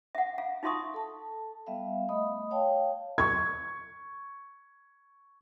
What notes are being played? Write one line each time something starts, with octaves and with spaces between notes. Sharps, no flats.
E5 F#5
F5
D#4 F4 E5 C6 C#6 D#6
A4 A5
G3 B3 E5 F5
A3 D#5 B5 D#6
C#5 F5 G5 A5
C#6 G#6